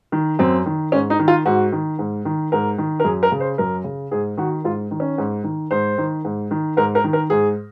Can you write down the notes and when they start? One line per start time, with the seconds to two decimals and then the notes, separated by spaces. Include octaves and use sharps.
0.12 D#3
0.39 F#2 C4
0.66 D#3
0.92 G#2 C#4
1.10 D#4
1.19 D#3
1.28 F4
1.46 G#2 F#4
1.72 D#3
1.99 G#2
2.25 D#3
2.52 G#2 A#4
2.78 D#3
3.00 A#4
3.04 F#2 G#4
3.23 A#4
3.32 C#3
3.40 C5
3.58 F#2 A#4
3.84 C#3
4.11 G#2 G#4
4.37 D#3 F#4
4.64 G#2 F4
4.91 D#3
5.00 C#4
5.18 G#2
5.44 D#3
5.71 G#2 C5
5.98 D#3
6.25 G#2
6.51 D#3
6.77 G#2 A#4
6.95 A#4
7.04 D#3
7.13 A#4
7.30 G#2 G#4